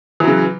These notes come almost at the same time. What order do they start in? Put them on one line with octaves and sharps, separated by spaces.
E3 F#3 C#3